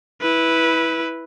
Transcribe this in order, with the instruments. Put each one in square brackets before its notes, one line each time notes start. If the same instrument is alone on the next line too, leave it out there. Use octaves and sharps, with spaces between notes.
[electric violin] E4 B4